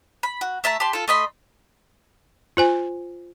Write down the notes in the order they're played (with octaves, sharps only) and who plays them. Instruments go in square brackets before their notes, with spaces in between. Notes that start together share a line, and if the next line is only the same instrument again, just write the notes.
[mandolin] B5
F#4
A3 E5 A5 A#5
G4 A5 C6
F4 A4
A3 D#5 B5 C6
[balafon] F4 C5 G#5